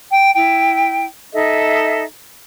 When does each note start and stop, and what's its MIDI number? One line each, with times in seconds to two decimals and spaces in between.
0.11 0.32 79
0.34 1.05 64
0.34 1.05 79
1.33 2.03 63
1.33 2.03 69
1.33 2.03 75
1.33 2.03 76